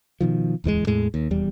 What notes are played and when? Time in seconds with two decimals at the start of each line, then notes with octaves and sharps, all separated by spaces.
0.21 B2 D#3 F3
0.64 D1 E2 D#3 G#3
0.87 E2 A2 G#3
1.14 D#2
1.31 D#1 E2 G3